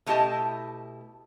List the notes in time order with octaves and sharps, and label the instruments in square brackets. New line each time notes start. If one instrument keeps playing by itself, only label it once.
[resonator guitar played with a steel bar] B2 A3 E4 G4 D#5 A5